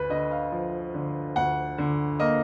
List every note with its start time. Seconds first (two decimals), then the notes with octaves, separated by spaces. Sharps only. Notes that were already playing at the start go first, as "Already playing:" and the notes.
Already playing: D2 B4
0.10 D3 D#5
0.31 F5
0.52 F3
0.94 D3
1.36 D2 F#5
1.78 D3
2.20 A#3 D#5